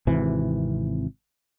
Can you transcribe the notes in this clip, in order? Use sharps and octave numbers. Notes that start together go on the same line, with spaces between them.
G#1 C3 E3